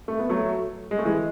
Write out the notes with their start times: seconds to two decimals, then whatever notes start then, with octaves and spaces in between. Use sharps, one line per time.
0.08 A3
0.19 B3
0.29 F#3 A3
0.91 G#3
0.98 A3
1.05 E3 G#3